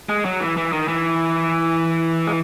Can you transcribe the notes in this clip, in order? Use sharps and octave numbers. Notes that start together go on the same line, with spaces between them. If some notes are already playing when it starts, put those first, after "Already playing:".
G#3
F#3
E3
E3
D#3
E3
G#3